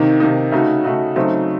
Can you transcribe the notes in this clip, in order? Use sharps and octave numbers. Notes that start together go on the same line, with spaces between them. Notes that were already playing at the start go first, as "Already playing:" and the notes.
Already playing: C3 D#3 A#3 D#4
C3 D#3 A#3 D#4
C#3 A3 D#4 F#4
C#3 A3 D#4 F#4
C#3 F#3 A3 C4 D#4